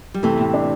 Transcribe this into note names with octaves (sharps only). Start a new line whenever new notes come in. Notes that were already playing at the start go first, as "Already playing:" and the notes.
G3
C3 E3 A3
A2
D4